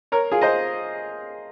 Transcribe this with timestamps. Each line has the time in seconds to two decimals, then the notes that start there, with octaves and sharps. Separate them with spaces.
0.12 A#4 C#5
0.32 F4 G#4
0.41 C5 D#5